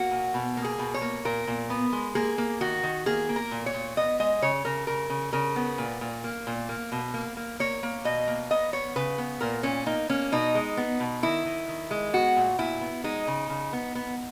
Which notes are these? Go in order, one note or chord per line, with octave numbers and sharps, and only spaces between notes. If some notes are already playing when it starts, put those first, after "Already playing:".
Already playing: A#3 F#4
A#2
B2
A#3
G#4
B2
C#5
A#3
A#2 A#4
A#2
B3
G#3
A#3 G#4
A#3
D#3 F#4
D#3
A#3 G#4
A#3
A#4
A#2
C#5
A#2
B3 D#5
G#3 D#5
C#3 C#5
C#3 A#4
C#3 A#4
C#3
C#3 A#4
B3
A#2
A#2
A#3
A#2
A#3
B2
A#3
A#3
A#3 C#5
A#3
B2 D#5
A#3
B3 D#5
B3 C#5
C#3 B4
B3
A#2 A#4
A#2 C#4
A#3 D#4
A#3 C#4
B2 D#4
G#3
B3
B2
D#3 E4
D#3
D#3
G#3
B3 F#4
A#2
A#2 E4
B3
G#3 D#4
C#3
C#3
B3
B3